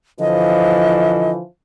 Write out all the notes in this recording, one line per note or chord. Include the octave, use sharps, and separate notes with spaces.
D3 E3 F3 D#5